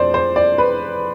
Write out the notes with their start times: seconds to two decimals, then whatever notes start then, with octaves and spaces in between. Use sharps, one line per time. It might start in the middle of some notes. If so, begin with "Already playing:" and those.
Already playing: F2 C5 D5
0.14 C5
0.36 D5
0.58 B4